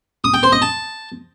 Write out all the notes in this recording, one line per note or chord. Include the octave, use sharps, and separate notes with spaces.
D#6
G5
C5
D#5
A5